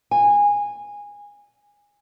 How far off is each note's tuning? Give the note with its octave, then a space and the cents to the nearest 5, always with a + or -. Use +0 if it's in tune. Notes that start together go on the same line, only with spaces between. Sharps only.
G#5 -15